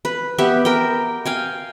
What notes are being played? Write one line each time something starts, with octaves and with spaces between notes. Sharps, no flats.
B4
B3 G4 E5
A#4 G5
F5 G5 G#5